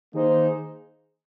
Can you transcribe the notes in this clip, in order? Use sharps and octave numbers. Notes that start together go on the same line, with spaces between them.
D#3 A#3 D#4 G#4 C5